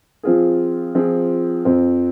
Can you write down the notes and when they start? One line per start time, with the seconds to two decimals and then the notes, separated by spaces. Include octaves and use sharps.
0.23 F3 C4 F4 G#4
0.95 F3 C4 F4 G#4
1.65 F2 F3 C4